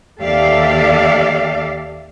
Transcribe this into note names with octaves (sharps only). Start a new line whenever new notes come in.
D#2 G4 A4 D5 E5 F5